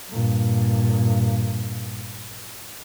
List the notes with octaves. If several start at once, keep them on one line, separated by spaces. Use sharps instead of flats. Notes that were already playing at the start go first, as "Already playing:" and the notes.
G2 A#2